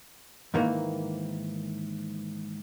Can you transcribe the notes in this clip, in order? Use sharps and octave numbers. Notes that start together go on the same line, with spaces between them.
G#2 D#3 E3 A#3